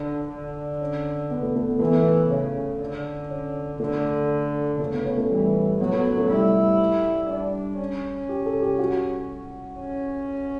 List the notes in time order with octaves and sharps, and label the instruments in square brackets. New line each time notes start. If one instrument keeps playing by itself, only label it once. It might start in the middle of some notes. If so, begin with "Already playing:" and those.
Already playing: [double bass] D3 [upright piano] D4
[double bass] D3
[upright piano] C#4
B3
A3
A3
B3
[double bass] E3 [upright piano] A3
[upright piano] B3
[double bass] C#3 [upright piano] C#4
[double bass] D3
[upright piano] C#4
[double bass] D3 [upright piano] A3
[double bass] C#3 [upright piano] A3
[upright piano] B3
C#4
A3
[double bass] E3 [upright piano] G3
[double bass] F#3 [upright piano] B3
[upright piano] A3
C#4
A3
[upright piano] G3 [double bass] E4
[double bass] D4
C#4
[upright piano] G4
A4
G4
F#4
[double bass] C#4